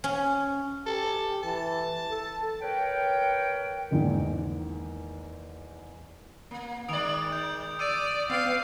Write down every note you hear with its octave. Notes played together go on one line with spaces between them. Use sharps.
C#4
G4 A4
E3 A5
A4
A#4 B4 C#5 G5
E2 G#2 D#3 E3 A#3
A#3
D#3 G#3 D5 D#6 D7 F7
G6
D5 D6 E6 D#7
B3 F5